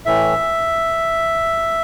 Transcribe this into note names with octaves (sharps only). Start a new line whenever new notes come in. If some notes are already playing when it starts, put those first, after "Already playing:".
A2 E3 E5